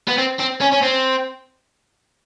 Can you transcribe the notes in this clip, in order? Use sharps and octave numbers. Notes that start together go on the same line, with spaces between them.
B3
C4
C4
C#4
C#4
C4